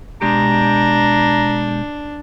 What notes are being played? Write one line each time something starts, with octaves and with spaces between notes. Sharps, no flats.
B2 G#3 D4 G4 A#5